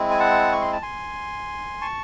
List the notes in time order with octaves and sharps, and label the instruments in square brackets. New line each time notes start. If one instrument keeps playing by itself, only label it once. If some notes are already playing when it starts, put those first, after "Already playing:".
Already playing: [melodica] G#3 C4 E4
G#5
F#5 A5
C#6
C6
A5
G#5 C6
A5 C#6